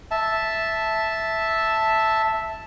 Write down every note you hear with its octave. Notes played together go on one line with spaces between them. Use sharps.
E5 A5